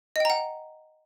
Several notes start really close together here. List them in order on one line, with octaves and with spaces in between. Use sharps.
D#5 G5 A#5 F#5